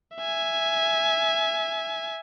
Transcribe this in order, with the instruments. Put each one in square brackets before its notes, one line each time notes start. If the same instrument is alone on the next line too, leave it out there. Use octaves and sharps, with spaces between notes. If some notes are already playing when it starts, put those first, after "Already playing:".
[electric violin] E5 G#5